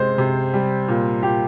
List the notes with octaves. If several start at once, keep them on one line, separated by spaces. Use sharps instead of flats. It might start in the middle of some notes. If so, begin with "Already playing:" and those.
Already playing: C3 G#3 C5
C3
G3
A#2
A#2 G4